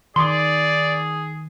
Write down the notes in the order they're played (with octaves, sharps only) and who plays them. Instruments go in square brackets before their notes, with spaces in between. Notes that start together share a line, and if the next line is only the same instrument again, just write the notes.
[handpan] D#3 [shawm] G#4 [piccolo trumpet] D5 [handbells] C6 D6